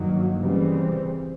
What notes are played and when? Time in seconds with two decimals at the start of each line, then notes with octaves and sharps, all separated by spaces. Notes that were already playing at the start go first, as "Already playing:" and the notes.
Already playing: G2 D#3 F#3 A#3
0.40 C#3 E3 G3 C4